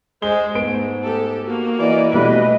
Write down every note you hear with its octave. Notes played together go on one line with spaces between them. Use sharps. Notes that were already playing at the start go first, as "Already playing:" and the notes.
G#3 C5 G7
G#2 A3 B3 D7
G4 A4
A#3 F#4
E3 D5 D#5
B2 G3 A3 B4 D#5